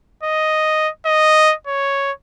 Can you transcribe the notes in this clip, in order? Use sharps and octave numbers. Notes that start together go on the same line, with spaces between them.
D#5
D#5
C#5